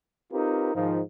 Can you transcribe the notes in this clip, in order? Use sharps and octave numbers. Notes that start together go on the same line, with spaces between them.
C4 D#4 F4 G4 A#4 B4
G#2 D#3 F3